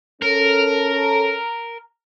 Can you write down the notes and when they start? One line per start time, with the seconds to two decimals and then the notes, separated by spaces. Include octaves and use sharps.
0.22 C#4 A4 A#4